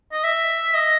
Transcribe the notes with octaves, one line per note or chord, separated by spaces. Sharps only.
D#5
E5
D#5